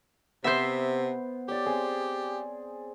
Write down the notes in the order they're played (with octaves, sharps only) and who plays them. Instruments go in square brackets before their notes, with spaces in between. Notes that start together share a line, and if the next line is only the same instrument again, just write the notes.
[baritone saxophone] C3 [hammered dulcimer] B3 [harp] C5 E5
[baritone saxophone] G4 [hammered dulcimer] C#5 D5
[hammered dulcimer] C4 G#4 C6